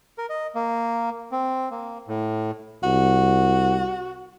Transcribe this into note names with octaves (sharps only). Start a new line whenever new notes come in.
A#4
D#5
A#3
C4
A#3
A2
C2 F#4